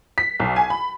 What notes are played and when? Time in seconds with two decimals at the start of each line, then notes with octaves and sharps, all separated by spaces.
0.18 B6
0.40 B1
0.56 G#5
0.70 B5